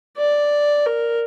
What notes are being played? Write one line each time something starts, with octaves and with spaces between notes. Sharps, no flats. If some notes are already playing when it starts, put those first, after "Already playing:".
D5
A#4